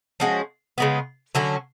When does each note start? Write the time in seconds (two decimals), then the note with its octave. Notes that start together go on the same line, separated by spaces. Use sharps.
0.20 F3 G#3 C#4 F#4
0.78 C#3 G#3 B3
1.35 D3 F#3 C#4 F#4